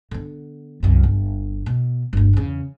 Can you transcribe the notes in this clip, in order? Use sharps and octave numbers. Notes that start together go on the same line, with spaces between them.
D3 B3
C2 F#2
G1
B2
G1 D2
E2 C#3